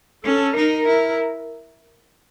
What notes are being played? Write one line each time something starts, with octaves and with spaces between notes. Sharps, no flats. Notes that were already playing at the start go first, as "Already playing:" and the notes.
C#4 A4
D#4 A#4
E4